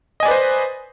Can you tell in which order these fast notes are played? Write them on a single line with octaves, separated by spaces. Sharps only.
D#5 G#5 D5 B4 C5